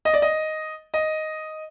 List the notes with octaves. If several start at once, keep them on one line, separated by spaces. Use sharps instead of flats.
D#5
D5
D#5
D#5